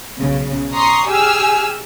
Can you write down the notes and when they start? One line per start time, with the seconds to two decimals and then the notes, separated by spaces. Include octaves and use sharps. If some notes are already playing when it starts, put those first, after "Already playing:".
0.20 B1 C#3
0.73 A#5 C6 C#6 D#6
1.07 G4 G#4 G#5 E6 F6